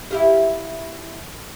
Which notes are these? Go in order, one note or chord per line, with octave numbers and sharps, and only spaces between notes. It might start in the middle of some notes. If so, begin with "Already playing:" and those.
E4 G4 F5